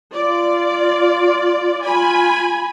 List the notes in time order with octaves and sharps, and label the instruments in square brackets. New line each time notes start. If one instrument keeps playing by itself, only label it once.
[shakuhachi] F4 [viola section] D5
[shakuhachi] F4 [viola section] G#5 B5